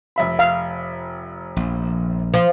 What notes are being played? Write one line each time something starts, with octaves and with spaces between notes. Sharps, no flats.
F1 E5 B5
F5
A#1
F3